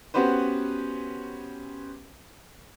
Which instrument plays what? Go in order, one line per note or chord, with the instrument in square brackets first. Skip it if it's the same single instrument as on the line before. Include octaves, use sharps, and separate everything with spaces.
[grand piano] B3 C#4 F#4 G4 B4 C5